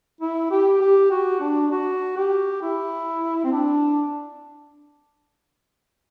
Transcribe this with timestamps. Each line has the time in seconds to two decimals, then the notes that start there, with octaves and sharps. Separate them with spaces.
0.21 E4
0.51 G4
0.81 G4
1.11 F#4
1.40 D4
1.72 F#4
2.17 G4
2.62 E4
3.44 C4
3.52 D4